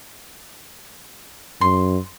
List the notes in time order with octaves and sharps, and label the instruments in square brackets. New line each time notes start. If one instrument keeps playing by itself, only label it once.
[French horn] F#2 [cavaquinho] C6